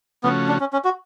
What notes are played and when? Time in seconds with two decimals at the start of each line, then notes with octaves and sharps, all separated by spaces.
0.23 C#3 F3 A3 B3 C#4 F#4
0.48 D4
0.60 C#4
0.73 C#4
0.84 F#4